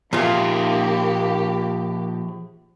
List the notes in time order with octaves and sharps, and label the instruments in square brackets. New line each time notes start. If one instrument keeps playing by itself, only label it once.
[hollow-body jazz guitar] A#2 F4 [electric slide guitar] F3 G#4 E5 [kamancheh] A#3 G4